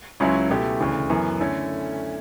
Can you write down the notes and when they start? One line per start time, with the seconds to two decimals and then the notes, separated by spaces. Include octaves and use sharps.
0.20 C#2 C#3 F#3 C#4 E4
0.50 B2 A3 E4 G4
0.80 D2 C#3 E3
1.10 F#2 E3 B3
1.40 D3 A3 C#4 E4